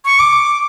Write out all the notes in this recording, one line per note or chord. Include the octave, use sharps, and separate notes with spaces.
C#6
D6